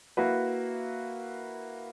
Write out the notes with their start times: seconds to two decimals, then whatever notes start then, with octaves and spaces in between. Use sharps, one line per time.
0.17 A#3 E4 F#4 B4